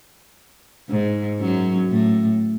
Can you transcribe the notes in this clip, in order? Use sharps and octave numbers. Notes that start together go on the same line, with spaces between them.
G#2
F#2 F#3
A2 A3